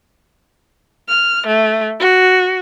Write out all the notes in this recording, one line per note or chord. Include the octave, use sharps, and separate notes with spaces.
F6
A3
F#4